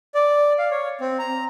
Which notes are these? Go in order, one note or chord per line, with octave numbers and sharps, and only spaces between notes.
D5
F5
C#5
C4
A#5